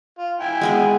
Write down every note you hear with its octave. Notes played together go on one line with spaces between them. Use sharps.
F4
E4 G5 G#5
G#3 B3 G#4